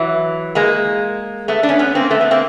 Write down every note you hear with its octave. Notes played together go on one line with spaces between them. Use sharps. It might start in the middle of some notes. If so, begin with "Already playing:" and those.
Already playing: E3 F#3
G#3 A#3
A3 B3
D4
B3 C#4
B3 C#4
A#3 C4
A3 B3
A3 B3
A#3 C4